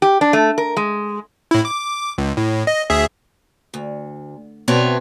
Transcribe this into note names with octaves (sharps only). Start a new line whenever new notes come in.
G4
D4
A3
A#4
G#3
A2 E4
D6
C#2
A2
D#5
D2 G#4 E5
D2
B2 B3 C4 C#5 E5 A5